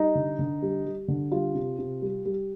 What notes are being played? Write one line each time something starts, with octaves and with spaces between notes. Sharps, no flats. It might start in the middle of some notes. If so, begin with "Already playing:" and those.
Already playing: G3 D#4
D3
D3
G3
G3
D3
G3 F4
C3
C3
G3
G3